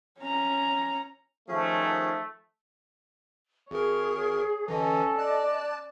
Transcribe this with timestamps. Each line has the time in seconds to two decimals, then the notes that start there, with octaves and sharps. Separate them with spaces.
0.20 C#4 A#5
1.48 D#3 F3 A3 C#4 G#4
3.71 G#1 G#4 A#4 C#5
4.68 A1 D3 E3 C#4 A4 D#5
5.19 D5 A5 F#6 A6